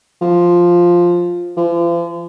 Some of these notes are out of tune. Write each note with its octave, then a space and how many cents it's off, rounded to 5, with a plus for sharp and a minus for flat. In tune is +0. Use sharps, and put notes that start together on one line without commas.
F3 +0
F3 -40